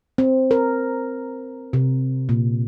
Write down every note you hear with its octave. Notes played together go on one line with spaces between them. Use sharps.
C4
A#4
C3
A#2